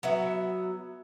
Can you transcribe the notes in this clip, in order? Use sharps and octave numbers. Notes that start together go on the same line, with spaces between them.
F#3 B3 E5